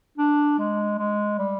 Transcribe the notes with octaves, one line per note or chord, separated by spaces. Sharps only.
D4
G#3
G#3
G3